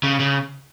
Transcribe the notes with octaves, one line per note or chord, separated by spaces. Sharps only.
C#3
C#3